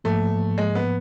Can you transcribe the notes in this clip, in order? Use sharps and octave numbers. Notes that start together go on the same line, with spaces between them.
G#2 F3 A3 A#3
G#3
B3